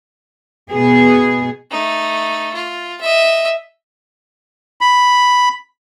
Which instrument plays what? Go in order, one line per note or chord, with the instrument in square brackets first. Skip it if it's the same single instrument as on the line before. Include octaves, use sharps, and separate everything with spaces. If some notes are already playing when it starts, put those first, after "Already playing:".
[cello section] B2 B3 G#4
[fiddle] A3 D#4
F4
D#5 E5
[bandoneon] B5